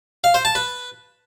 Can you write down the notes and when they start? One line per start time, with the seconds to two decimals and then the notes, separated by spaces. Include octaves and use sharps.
0.24 F5
0.34 C5
0.45 A5
0.55 B4